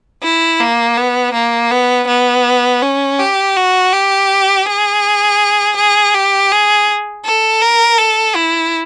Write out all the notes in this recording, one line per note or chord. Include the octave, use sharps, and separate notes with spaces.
E4
A#3
B3
A#3
B3
B3
C#4
G4
F#4
G4
G#4
G#4
G4
G#4
A4
A#4
A4
E4